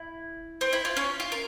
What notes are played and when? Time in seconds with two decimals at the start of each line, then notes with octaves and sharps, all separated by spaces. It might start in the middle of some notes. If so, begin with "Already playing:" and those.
Already playing: E4
0.61 C4
0.73 E4
0.85 F4
0.97 C#4
1.20 F4
1.32 A#4